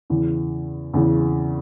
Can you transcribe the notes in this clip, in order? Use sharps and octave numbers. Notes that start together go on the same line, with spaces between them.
E2 C#3 E3
E2 C#3 E3